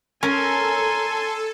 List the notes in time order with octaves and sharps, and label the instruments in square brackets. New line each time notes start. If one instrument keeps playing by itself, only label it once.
[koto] C#4 [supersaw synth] A4 [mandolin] A#4 [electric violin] G#5 C6